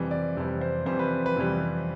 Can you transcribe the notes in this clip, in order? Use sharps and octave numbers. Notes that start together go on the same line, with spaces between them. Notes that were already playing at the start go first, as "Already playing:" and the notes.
Already playing: F2 C3 E3 G3
D5
F2 C3 E3 G3
C5
F2 C3 E3 G3 C5
B4
B4
F2 C3 E3 G3